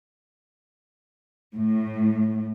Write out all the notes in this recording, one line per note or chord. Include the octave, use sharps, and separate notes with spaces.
A2